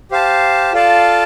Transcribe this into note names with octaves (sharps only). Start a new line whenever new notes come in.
G4 C5 F5 A5
F4 A4 D5 F5 A5